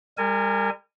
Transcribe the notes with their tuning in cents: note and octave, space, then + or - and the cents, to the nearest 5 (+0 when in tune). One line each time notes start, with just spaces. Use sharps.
G3 +35 A#4 -30 G#5 +0